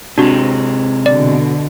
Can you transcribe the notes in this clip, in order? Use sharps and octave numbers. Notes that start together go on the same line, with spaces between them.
C3 G#3 C4 D4 F#4
B2 D3 D5